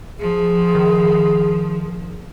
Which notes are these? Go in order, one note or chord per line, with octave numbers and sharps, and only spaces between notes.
F3 G#4
D#3